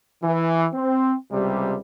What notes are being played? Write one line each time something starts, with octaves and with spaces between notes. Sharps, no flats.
E3
C4
C#2 C3 G3